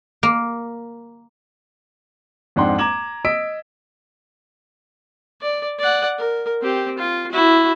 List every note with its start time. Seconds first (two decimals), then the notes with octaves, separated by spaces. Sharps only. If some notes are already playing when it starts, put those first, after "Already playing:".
0.23 A#3
2.56 F2 G#2 D4 F#5 G5 C6
2.78 A#5 D6 G#6 E7 F#7
3.25 D#5 E6 B6 D7
5.42 D5
5.79 D5 F#5
6.18 A#4
6.62 C4 G4
6.98 F4
7.32 E4 F#4